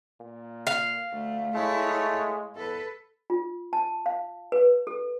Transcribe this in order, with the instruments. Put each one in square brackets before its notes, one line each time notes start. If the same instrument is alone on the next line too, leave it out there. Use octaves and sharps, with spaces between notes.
[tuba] A#2
[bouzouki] F5
[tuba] D2 [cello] A3
[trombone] G#3 [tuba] A3 [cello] E4 C#5
[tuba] E2 [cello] A4 B4
[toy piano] F4
A5
F5
B4
A4